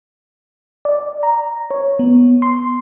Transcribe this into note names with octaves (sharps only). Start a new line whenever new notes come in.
D5
A#5
C#5
B3
C6